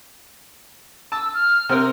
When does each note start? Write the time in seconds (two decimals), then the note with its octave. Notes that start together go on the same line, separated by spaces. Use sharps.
1.12 A5 E6
1.34 F6
1.69 C3 C4 A#4 F6